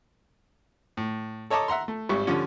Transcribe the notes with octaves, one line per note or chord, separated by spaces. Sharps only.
A2
A4 C#5 D#5 A5 A#5 D6
E5 F#5 A#5 C6
A3
G#1 G3 C#6
D3 F3 G3 C#4